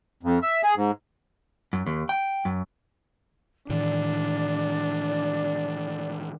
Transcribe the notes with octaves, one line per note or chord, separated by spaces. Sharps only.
F2
E5
G#4
G#2
F#2
D#2
G5
F#2
A2 D#3 E3 D4 D5